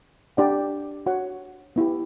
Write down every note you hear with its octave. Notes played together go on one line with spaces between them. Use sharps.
D4 G4 D5 F#5
F#4 C#5 F#5
B3 E4 G4